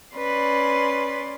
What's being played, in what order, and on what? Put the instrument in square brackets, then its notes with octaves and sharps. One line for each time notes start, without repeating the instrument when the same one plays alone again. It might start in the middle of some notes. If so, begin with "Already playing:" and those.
[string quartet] C#4 D5 C6 [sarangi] B4